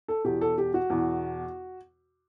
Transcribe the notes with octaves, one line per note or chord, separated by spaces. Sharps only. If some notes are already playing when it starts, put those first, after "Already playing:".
A4
E2 B2 G4
A4
G4
F#4
E2 B2